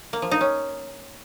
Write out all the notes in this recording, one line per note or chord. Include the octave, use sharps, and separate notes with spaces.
A#3
F3
D#4
C#4